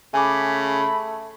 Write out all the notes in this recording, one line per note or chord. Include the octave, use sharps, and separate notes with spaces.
C#3 A3 G#5 B5 D6